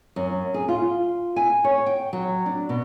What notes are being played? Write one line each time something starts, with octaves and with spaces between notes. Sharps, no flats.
F#2
G#4
F4
G#5
C#5
G5
F#3
D4
B2